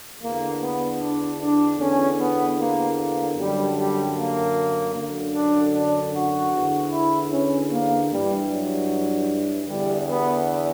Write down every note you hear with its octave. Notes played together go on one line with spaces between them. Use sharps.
E2 D3 A#3
B3
D4
D4
E2 D3 C#4
B3
A#3
A#3
F#2 D3 G3
G3
A#3
F#2 D3
D4
D4
F#4
E2 D3
E4
C#4
A#3
G2 E3 G3
F#3
E2 D3 G3
B3